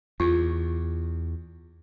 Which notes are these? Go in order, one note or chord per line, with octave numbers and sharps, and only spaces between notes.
E2 F4